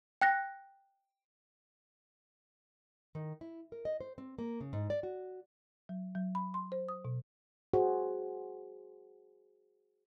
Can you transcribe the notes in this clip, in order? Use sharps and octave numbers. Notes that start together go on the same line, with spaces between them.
G5 F#6 A#6
D#3
E4
A#4
D#5
C5
C4
A#3
C#3
G#2
D5
F#4
F#3
F#3
B5
C6
C5
D#6
B2
F#4 G#4 C5